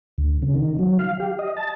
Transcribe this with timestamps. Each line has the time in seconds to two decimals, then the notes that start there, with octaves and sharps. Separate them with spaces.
0.18 D2
0.42 C#3
0.54 D#3
0.79 F#3
0.99 F5
1.20 G4
1.39 D#5
1.57 A5